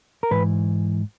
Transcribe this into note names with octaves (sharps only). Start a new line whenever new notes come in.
A#4
G#2 E3 B4